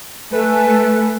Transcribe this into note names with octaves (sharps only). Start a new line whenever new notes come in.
A3 A4 B4 G#5 F#6